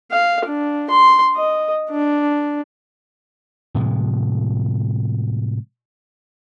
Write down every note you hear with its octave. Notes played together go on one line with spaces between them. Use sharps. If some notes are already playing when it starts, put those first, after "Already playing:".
F5
D4
C6
D#5
D4
A2 C3 F3 G#3